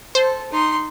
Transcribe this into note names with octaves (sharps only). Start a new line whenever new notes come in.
A4 C5
D#4 C6